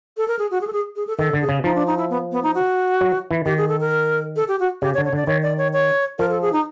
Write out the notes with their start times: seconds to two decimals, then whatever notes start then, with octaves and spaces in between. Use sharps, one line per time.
0.17 A4
0.28 A#4
0.39 G#4
0.51 F#4
0.61 G#4
0.67 A4
0.73 G#4
0.96 G#4
1.07 A4
1.18 D#3 A4
1.33 D3
1.41 G#4
1.49 C#3
1.64 F3 D#4
1.75 D4
1.87 D#4
1.97 E4
2.10 B3
2.32 B3
2.43 D#4
2.55 F#4
3.01 F#3
3.31 E3
3.46 D#3 G4
3.57 G#4
3.69 A4
3.80 A#4
4.36 A4
4.48 G4
4.60 F#4
4.82 C#3 G4
4.94 C#5
4.98 D3
5.05 C#5
5.13 D3 D5
5.27 D#3 C#5
5.43 D5
5.58 C#5
5.73 C#5
6.19 F3 A#4
6.30 A4
6.42 G#4
6.53 D#4